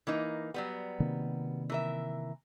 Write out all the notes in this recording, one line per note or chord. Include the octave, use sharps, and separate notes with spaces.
E3 A#3 D#4
F#3 G3 B3
C3 D#3 A#3
E3 A#4 E5